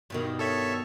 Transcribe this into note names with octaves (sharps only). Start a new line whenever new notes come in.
G2 B2 D#3
A4 C#5 E5